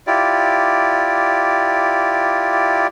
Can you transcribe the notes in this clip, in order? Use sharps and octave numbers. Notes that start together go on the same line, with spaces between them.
E4 F4 G4 D5